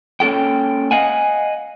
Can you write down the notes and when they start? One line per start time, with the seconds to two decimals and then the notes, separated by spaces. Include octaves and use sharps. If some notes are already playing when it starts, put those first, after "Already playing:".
0.20 A#3 C#4 F4 A4 G5
0.91 D#5 F5 F#5 G#5